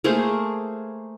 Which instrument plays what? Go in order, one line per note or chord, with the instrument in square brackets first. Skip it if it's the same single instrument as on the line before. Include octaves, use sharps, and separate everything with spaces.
[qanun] A3 A#3 G#4 C5